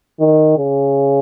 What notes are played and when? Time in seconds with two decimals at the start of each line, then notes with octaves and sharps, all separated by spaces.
0.20 D#3
0.58 C#3